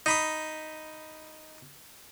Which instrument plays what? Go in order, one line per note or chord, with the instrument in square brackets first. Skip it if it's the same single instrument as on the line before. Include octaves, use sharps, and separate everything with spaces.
[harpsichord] D#4 B5 D#6